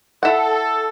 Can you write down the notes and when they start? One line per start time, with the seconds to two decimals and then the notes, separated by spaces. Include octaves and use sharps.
0.23 E4 A4 F#5